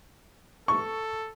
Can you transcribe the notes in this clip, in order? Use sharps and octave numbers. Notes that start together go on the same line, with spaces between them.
A4 C#6